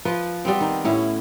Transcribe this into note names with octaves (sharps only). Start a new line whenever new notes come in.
F3 F4 B4
G3 B3 C4
D#3
A2 C#4 E4